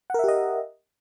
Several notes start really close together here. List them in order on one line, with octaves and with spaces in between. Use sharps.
F#5 A#4 E5 G4 D#5